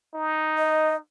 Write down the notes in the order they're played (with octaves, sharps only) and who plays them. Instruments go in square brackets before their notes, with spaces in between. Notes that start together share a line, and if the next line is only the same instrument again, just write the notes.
[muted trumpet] D#4
[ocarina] D#5